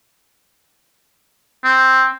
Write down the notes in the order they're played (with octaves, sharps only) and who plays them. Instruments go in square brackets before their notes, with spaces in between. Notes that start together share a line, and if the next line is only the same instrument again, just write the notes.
[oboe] C4